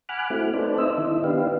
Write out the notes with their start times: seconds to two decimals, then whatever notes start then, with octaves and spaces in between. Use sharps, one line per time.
0.09 F#5 G#5 B5 D6 F6 F#6
0.30 A3 C4 E4 F#4
0.54 D#4 A4 B4 C5 D5
0.78 C4 D#4 C5 D#5 E5 E6
0.98 D#3 E4
1.24 B3 D4 D#4 G4 B4 F5